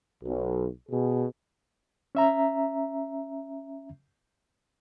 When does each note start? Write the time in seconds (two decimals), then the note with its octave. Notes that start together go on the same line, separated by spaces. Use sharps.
0.23 B1
0.89 B2 G#4
2.15 C#4 E5 A#5